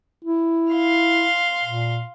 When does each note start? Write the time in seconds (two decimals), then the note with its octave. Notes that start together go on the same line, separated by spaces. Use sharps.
0.25 E4
0.71 F5 C6
1.65 A#2